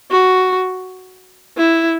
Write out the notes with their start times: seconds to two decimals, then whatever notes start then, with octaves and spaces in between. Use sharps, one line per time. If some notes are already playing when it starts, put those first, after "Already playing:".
0.11 F#4
1.58 E4